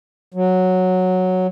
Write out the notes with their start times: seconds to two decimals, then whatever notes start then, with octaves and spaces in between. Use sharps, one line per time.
0.34 F#3